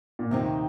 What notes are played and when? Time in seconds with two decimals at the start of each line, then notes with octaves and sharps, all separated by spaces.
0.19 A#2
0.31 D#2 C3 D#3 C4 D#4